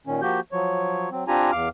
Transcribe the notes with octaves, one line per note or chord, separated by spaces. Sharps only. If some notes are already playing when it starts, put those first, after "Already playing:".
A#2 D#3 C#4
F3 A#3 F#4 G4 G6
F3 F#3 C#5
F#3 C4
C4 D4 F4 G4 G#5 A#5
E2 F5 D6 F6